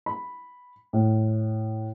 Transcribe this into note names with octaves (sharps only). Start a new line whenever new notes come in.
B5
A2